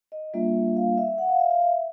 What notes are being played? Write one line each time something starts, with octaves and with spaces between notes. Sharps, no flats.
D#5
G3 A#3 D4 F4 E5
F5
E5
F#5
F5
E5
F5
E5